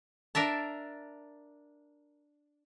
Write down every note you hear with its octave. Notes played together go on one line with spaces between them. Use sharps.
D4 A#4 E5 A5